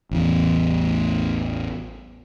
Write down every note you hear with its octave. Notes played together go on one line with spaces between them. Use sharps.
A1 E2